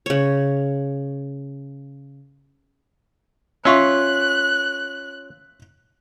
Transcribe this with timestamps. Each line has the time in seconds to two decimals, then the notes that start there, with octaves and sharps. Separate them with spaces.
0.06 C#3 C#5
3.65 C#4 F4 E5 C6 C#6 F#6